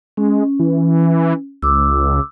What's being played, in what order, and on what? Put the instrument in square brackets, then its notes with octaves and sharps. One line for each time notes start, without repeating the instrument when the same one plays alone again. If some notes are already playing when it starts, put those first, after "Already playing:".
[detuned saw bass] G#3 [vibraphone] C#4
[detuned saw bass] E3
[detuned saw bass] C#2 [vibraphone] D6 E6